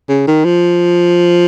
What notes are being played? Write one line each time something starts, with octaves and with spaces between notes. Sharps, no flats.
C#3
D#3
F3